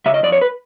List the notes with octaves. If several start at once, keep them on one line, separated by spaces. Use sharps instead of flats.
C#3 E5
D#5
F2 D5
C#5
B4